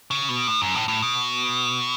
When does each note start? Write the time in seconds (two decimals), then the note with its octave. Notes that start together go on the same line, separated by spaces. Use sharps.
0.11 C#3
0.29 B2
0.47 A2
0.62 F#2
0.75 A2
0.88 A2
1.02 B2